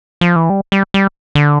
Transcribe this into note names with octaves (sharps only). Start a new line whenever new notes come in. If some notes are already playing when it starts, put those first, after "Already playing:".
F3
E3
G3
G3
G3
D3